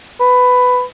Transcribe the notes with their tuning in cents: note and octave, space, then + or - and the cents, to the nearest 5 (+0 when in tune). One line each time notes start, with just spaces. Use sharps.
B4 +15